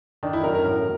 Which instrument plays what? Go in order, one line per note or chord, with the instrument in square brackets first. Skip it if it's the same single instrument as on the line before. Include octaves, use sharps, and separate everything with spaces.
[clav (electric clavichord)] D#3 [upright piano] D4
[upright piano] E4
[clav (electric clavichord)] F#2 [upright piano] A#4
[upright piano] A#4
[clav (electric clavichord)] A2